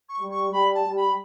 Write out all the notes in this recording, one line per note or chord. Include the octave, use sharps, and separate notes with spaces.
C#6
G3
C#6
G3 B5
A5
G3
B5